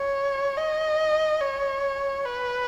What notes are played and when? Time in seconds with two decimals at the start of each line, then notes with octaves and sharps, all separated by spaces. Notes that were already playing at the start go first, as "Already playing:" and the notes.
Already playing: C#5
0.57 D#5
1.41 C#5
2.25 B4